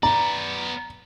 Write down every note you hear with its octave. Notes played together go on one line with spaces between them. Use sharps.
B3 D5 A#5